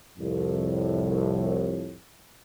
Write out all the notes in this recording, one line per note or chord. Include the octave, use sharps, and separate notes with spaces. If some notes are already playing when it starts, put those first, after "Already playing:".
C2 F2 A2